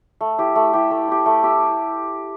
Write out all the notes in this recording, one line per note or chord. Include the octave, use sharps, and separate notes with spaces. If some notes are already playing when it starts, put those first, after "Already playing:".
A3
E4 G4
A3
E4 G4
A3
E4 G4
A3
E4 G4